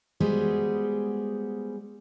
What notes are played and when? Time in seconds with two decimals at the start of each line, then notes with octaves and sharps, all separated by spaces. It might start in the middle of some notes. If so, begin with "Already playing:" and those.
0.20 G3 G#3 B3 F#4 G#4 C5